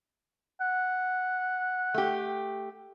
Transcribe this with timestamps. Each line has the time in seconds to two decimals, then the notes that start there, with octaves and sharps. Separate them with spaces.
0.61 F#5
1.94 A3 G4